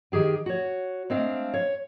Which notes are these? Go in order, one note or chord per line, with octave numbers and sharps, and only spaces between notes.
D#3 G4 G#4 G5
F#4 C#5
G#3 A3 C4 D4 F5
C#5